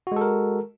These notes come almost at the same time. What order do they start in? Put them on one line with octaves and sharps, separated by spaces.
F#4 G#3 A4 A#4